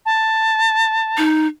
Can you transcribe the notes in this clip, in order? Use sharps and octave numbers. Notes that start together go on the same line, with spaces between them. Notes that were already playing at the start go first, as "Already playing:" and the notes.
A5
D#4